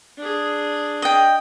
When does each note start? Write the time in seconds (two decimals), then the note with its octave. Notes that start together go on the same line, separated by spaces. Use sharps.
0.18 D4 G#4
1.02 D#5 G5